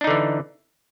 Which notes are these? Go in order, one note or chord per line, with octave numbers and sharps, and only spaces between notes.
D3 E3 D4 D#4